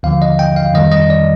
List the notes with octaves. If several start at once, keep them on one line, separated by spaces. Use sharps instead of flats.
D#2 D3 F3 F5
D#5
G5
F5
F2 D#3 G3 D#5
D#5
D5